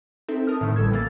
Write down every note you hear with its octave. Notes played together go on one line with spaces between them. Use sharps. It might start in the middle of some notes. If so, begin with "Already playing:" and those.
C4 D#4 A4 E5
A#4 A5 D#6 F6
A2 D3 D#3 A3
A1 G3 A4 E6 G#6
E3 A#3 A6